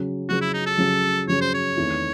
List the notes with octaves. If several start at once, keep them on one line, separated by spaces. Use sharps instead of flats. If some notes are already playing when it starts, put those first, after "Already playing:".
Already playing: C#3 F#3 C#4 G#4
C#3 F#3 C#4 F#4 G#4
E4
D#4
A4
C#3 F#3 C#4 G#4
C#3 F#3 C#4 G#4 C#5
C5
C#5
E2 D#3 A3 C4 E4